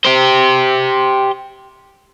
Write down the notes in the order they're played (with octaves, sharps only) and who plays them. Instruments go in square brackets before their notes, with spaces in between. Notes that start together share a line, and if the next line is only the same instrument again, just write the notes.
[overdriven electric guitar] G4 C5